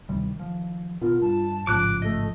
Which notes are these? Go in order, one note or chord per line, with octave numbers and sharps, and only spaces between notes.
D2 C3 D#3 G3
F3
B2 F4 A#4
G2 A5
A1 G#2 C#3 F3 D6 F#6
A3 D#5